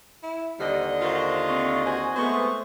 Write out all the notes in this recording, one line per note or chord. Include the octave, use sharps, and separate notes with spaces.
E4
D#2 D3 G3 C5 D#5
F4 F#4 A#4 C5
C4 C#6
F#4 C5 G#5
G#3 A3 B3 C5 C#6